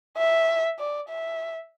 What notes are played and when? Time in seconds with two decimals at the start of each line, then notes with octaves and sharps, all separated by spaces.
0.17 E5
0.79 D5
1.09 E5